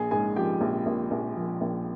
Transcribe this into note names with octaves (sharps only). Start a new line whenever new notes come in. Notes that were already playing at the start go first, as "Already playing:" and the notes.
Already playing: A#1 G#4 G#5
G#2 G#4 G#5
F3 G4 G5
A#1
A#1
A#1
F3
A#1